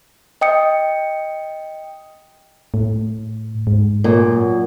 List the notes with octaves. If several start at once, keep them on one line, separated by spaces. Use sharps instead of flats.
D#5 G5 D#6 C#7
A2
G#2
F#2 A#2